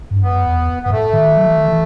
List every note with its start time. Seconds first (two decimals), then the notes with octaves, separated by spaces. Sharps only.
0.11 G2
0.22 F#2 B3
0.45 E2
0.83 B3
0.86 G2
0.90 A2 A3
1.13 D#3
1.37 F#3
1.47 E3
1.57 D#3
1.68 E3